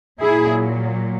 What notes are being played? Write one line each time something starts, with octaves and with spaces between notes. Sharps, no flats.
A#2 F#3 E4 G#4